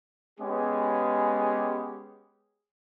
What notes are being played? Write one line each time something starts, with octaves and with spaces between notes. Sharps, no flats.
G#3 B3 C#4 G4 G#4